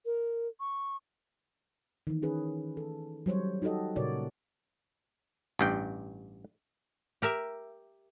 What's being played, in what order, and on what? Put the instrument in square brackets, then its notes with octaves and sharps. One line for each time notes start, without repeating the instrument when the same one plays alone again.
[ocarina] A#4
C#6
[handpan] D#3 E3
C#4 G#4 B4
A4
F#3 G3 C5 C#5
D#4 F#4 G4 A4 D#5
A#2 C#3 F#4 A#4 C#5 D5
[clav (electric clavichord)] A1 G2 G5
[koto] G4 A#4 E5